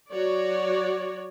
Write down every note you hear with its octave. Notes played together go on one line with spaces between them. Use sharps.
F#3 F#4 C#5 D5